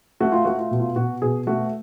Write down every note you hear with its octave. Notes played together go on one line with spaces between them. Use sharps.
A3 F#4
F4
A3 F#4
F4
B2
F4
B2 F#4
B2 G#4
A3 F#4